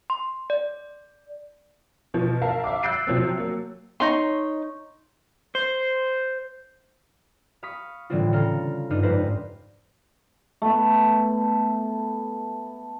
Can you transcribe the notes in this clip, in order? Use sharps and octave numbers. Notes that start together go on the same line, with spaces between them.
C6
D5
B2 E3 F3
A#4 E5 F5 A5
E5 F5 D6
E6 F#6 G6 A6 C7 D7
C3 F3 F#3 C4
F#3 A#3
D#4 C#5 C6
C5
F5 B5 C#6 D#6 B6
A2 D3 E3 G3 C4 F4
C#3 A4 F5 A#5 C6 F6
G2 D4 D#4 F4 F5 D#6
F1 G#2 B4 C5 F5 A#6
A3 B3